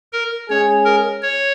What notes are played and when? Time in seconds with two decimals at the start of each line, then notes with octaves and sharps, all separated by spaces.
0.13 A#4
0.49 G#3 C#4 G#4 C#5
0.85 A#4
1.22 C#5